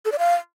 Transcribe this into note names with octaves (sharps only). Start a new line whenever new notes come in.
A4
D5
F5